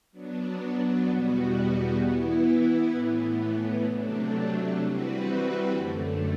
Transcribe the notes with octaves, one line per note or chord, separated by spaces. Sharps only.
F#3 B3 D4
E2 B2 G3 B3 F#4
E3 B3 E4
A2 E3 B3
C3 F#3 A3 D4
E3 G3 C4 F#4 B4
F#2 D3 A3